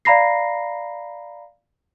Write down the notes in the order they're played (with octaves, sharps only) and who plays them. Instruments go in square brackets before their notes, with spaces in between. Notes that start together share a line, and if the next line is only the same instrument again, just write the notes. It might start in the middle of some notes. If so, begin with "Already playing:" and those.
[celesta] D5 F5 A#5 B5 A#6 C7